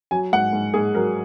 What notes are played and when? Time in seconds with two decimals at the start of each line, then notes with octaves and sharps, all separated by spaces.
0.11 F#3 G#5
0.33 G#2 F#5
0.53 G#2
0.74 G#2 G#4
0.95 F#3 A#4